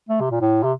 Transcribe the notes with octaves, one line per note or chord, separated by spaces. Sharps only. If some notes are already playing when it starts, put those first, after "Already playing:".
A3
C3
A#2
A2
C3